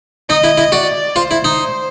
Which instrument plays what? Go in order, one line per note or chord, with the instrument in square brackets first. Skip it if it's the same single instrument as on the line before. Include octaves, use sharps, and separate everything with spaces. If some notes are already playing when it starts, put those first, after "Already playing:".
[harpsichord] D#4 [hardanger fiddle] D#5
[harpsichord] E4
E4
[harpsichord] F#4 [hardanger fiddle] D5
[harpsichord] F4 [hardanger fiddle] C5
[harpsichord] E4
D#4